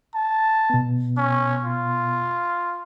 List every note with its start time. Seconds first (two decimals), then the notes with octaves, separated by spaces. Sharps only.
0.15 A5
0.70 B2 B3
1.17 C#4
1.65 F4